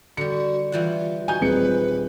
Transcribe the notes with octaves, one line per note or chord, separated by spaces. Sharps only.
D3 G3 F#4 C#7
E3 G3 F4 F#5
D#4 F#4 G#5 G6
D#1 C4 G#4 B4 C#7